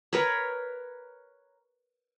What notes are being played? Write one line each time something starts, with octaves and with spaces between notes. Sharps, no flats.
A#4 B4 C#5